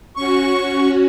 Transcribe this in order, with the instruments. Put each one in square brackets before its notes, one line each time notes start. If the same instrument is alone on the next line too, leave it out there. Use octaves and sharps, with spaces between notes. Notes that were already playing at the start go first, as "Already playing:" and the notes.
[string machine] C#4 F#4 [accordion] C#6